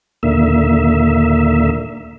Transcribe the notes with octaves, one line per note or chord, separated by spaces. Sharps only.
D#2 A#2 D3 A#3 E5